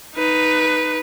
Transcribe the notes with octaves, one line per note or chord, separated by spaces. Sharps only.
D#4 B4